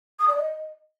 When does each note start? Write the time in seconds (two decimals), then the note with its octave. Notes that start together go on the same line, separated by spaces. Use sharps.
0.19 D#6
0.28 D5
0.37 D#5